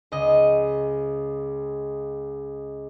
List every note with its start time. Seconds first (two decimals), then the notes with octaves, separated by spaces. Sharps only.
0.12 C#2 D#5